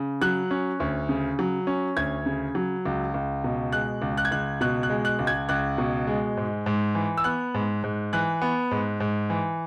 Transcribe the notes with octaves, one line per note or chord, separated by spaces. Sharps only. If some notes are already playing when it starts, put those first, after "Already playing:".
Already playing: C#3
F#3 F#6
C#4
D2
C#3
F#3
C#4
D2 G#6
C#3
F#3
C#2
C#2
B2
G#3 F#6
C#2
F#6
G#6
C#2 F#6
B2 F#6
F#6
G#3
F#6
C#2
G#6
C#2 F#6
B2
G#3
G#2
G#2
E3
E6
B3 F#6
G#2
G#2
E3 F#6
B3
G#2
G#2
E3